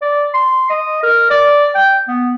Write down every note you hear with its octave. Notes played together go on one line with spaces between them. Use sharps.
D5
C6
D#5
A#4
D5
G5
B3